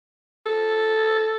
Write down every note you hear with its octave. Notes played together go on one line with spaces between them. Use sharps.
A4